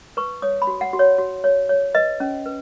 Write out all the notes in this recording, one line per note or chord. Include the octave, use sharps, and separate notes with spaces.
B4 C#6
C#5 D#6
B5
F#4
F#5
F#4
C#5
F#4
C#5
C#5
B4 D#5
C#4
B4